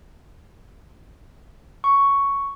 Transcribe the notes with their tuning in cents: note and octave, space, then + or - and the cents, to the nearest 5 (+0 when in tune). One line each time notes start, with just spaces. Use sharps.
C#6 +5